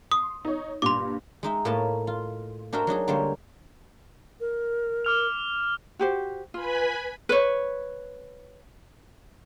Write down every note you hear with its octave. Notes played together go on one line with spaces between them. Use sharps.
C6 D#6
D#4 C#5
G2 A#2 C6 D6
G#3 D#4 E5
A2 A#3 B4 C#5 D#5 A5
F4
D4 F#4 A#4 C5 E5 G5
F#3 D4 D#4 G#4
D3 G3 G#3 A#3 C5 C#5
A#4
D6 F6 F7
F#4 G4 C5
F4 B4 G#5 B5
B4 C#5